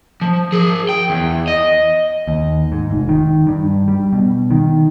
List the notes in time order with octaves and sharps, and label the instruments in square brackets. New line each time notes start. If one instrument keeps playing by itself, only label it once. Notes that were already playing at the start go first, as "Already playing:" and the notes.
[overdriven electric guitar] F3
G#4 A#4
G5
E2
D#5
[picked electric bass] D#2
G#2
F1
D#3
G2
G3
B2
D#3